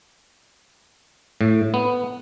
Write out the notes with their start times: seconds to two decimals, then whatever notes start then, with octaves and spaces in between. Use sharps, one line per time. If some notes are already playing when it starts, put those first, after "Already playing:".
1.41 A2
1.74 B3